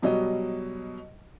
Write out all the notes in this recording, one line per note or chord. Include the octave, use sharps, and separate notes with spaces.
B2 F#3 G3 D#5